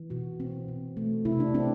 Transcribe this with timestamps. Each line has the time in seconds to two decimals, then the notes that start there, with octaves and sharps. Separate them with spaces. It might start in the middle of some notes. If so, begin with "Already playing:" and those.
Already playing: E3
0.10 B2 F#4
0.40 C4
0.68 B2
0.97 A3
1.25 C3 E4
1.40 D4
1.54 C4 D4